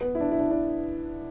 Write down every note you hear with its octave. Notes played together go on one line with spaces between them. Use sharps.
B3
E4
D4
E4
D4
D4